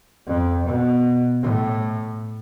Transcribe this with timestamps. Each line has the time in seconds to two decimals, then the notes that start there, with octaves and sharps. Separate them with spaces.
0.27 F2
0.66 B2
1.42 A2